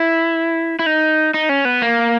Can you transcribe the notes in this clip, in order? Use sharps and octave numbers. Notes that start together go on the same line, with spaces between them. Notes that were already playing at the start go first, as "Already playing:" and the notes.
Already playing: E4
E4
D#4
D#4
C#4
B3
A#3